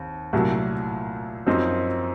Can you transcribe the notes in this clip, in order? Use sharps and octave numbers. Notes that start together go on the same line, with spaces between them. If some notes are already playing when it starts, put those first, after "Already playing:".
Already playing: D#2 C4
C2 A#2 F#3 A3
F#2 F3 C4 D#4